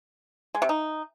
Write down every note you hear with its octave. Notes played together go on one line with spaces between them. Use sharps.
G#3
C3
D#4